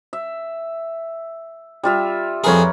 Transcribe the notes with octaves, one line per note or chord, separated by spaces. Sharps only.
E5
G3 F4 E5
F2 G#4 A#4 B4 C#5